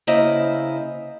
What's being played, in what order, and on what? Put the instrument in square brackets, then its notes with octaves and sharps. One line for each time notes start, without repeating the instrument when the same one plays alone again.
[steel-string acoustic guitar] C#3 A#3 E4 C5 D#5 A#5